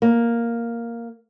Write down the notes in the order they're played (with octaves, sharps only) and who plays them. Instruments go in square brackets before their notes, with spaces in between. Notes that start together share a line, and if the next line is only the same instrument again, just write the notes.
[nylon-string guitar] A#3